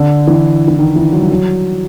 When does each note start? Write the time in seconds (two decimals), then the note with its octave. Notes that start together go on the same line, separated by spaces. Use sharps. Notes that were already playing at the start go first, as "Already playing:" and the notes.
Already playing: D3
0.27 E3
0.68 E3
0.79 D#3
0.96 E3
1.13 F#3
1.22 G3
1.32 F#3